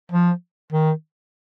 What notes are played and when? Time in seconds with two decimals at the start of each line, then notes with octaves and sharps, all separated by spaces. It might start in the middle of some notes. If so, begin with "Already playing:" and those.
0.12 F3
0.73 D#3